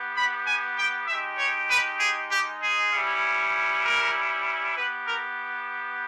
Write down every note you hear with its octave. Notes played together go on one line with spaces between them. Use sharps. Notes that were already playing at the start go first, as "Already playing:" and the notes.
Already playing: B3 G4
B5
G#5
G5
G#3 D#4 G4 E5
C#5
B4
G#4
G4
G#4
G3 C#4 E4
A#4
B3 G4 B4
A#4